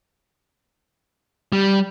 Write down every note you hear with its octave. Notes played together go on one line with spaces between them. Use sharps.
G3